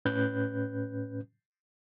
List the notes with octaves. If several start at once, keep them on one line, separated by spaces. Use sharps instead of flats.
A2 C#4 B4 F#6 G6